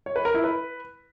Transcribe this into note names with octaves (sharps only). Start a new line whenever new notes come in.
C#5
B4
A#4
E4
B4